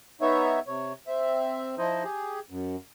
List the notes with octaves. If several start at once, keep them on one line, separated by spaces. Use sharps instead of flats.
B3 D#4 C#5 E5
C3 C#5
C4 E5
F3 D#4 E4 C5 D#5
G4 G#4
F#2